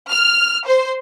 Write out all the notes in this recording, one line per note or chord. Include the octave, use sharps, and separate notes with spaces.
F6
C5